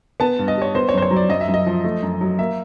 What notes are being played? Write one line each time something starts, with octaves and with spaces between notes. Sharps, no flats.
B3 A5
G2
D#5
G3 C#5
B3 C5
C#5
F#2 C5
C#5
F#3
D5
F#2 D#5
E5
F#2
D#5
F3
A3
F#2
F#3
A#3 E5